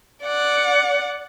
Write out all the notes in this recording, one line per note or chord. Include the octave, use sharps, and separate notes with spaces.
D5 F#5